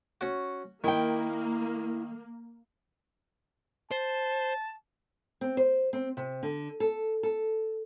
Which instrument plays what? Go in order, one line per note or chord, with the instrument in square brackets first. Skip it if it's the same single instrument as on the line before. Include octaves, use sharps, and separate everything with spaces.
[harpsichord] C#4 F#4
[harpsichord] D#3 [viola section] A#3 [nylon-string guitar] E4 G5
[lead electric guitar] C5 [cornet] A5
[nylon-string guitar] C4
C5
C4
C3
D3
A4
A4